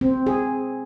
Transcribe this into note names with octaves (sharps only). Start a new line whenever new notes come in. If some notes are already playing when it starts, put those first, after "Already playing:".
C4
G#4